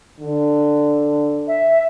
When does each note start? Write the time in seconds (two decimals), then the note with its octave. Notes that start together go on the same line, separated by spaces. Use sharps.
0.20 D3
1.48 E5